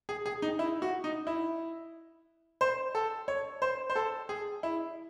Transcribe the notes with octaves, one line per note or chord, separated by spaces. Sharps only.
G#4
G#4
D#4
E4
F#4
D#4
E4
C5
A4
C#5
C5
C5
A4
G#4
E4